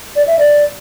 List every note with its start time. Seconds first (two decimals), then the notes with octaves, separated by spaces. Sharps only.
0.16 D5
0.27 E5
0.39 D5